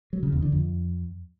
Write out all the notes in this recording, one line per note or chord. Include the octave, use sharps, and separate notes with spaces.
F#3
C#3
E2
D3
F2